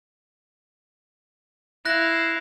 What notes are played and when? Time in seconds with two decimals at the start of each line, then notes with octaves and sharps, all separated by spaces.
1.85 E4 F5 F#6 A#6